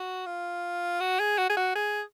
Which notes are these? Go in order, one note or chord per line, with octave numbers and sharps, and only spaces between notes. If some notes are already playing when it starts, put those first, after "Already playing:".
Already playing: F#4
F4
F#4
G#4
F#4
G#4
F#4
G#4